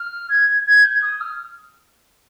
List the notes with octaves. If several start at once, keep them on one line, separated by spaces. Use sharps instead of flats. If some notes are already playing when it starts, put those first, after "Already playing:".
Already playing: F6
G#6
G#6
G6
D#6
F6